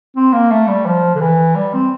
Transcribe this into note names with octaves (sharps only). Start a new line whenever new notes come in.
C4
A#3
A3
G3
F3
D3
E3
G3
C4